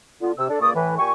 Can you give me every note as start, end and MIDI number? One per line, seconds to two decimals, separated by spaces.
0.21 0.32 50
0.21 0.32 59
0.21 0.32 65
0.38 0.49 48
0.38 0.49 88
0.49 0.59 62
0.49 0.59 69
0.49 0.59 74
0.61 0.73 37
0.61 0.73 46
0.61 0.73 58
0.61 0.73 74
0.61 0.73 85
0.61 0.73 87
0.75 0.95 45
0.75 0.95 52
0.75 0.95 71
0.99 1.13 46
0.99 1.13 67
0.99 1.13 80
0.99 1.13 85